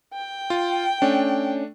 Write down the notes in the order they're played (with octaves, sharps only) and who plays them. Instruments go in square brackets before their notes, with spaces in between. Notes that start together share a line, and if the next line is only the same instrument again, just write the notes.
[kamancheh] G5
[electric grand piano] F4
[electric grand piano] A3 D4 [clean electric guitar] C#4